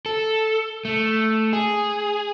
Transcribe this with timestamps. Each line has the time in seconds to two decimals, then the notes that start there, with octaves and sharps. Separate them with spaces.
0.06 A4
0.85 A3
1.53 G#4